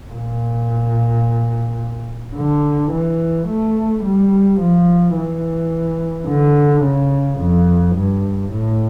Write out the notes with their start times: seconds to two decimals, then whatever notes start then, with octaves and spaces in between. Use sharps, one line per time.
0.12 A#2
2.36 D3
2.91 E3
3.48 A3
4.03 G3
4.60 F3
5.16 E3
6.28 D3
6.83 C#3
7.39 F2
7.95 G2
8.52 A2